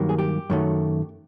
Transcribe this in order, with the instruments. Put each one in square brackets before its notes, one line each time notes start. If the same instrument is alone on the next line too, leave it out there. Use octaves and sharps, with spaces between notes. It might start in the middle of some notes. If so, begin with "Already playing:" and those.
Already playing: [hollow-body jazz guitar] G2 D#3 F#3 A#3
G#4
G4
F#2 D#3 F#3 A3